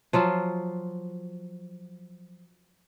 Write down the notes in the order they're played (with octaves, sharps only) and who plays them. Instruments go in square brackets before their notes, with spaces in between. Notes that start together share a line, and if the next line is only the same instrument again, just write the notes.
[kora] F3 F#3 F4